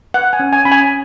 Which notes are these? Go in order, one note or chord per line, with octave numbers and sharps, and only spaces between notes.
B4 F#5
G#5
C#4
G#5
C#4 B5
G#5